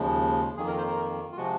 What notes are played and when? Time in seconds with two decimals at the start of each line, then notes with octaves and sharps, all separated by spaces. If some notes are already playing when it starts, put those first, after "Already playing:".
Already playing: D#2 C#3 F3 G#3
0.57 F2 D#3 A#3 G#4
0.68 A#4
0.78 C5
0.87 A#4
1.32 F4
1.36 C3 F3 G#3 F#4